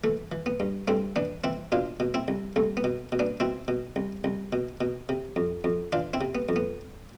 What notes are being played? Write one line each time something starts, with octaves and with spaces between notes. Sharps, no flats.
E3 A3
E3
B3
G2
G2 A3 C4
E3 B3 D4
E3 C4 E4
B2 D4 F4
B2
C4 E4
C2
C2 A3
B3
B2
B2
B3 D4
B2 C4 E4
B2
C2
C2
B2
B2
C3
F2
F2
E3 D4 F4
C4 E4
C3
B3
F2
B3